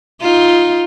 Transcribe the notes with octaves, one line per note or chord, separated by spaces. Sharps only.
D#4 F4